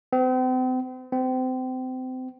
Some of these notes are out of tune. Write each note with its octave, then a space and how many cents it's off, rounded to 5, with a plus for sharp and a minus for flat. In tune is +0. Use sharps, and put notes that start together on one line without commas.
C4 -40
C4 -30